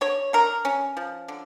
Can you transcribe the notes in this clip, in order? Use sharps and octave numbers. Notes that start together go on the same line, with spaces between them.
D3 C#5
D3 A#4
C#4
F3
D3